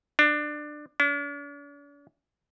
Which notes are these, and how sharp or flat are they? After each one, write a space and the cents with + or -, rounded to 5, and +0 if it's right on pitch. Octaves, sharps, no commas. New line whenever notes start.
D4 +20
D4 -45